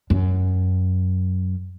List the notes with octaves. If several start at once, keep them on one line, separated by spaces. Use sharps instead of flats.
F#2